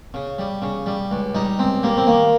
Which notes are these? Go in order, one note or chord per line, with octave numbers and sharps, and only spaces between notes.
C#3
G3
C#3
G3
C#2
G3 D#4
C#2 C4
G3 A#3
C4
D#3 A#3